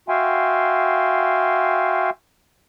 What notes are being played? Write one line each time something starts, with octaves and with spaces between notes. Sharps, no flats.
F#4 E5 F5 G5 G#5 C6